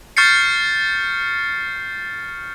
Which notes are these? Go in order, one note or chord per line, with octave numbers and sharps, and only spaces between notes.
C#6 F6 G6 A6 C7 C#7